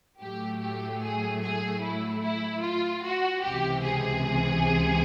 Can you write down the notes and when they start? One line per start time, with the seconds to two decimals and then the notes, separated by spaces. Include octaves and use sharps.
0.21 A2 F#3 A3 G4
0.61 G4
1.02 G#4
1.43 G#4
1.83 E4
2.23 E4
2.63 F4
3.05 F#4
3.44 C#2 C3 E3 G4
3.85 G#4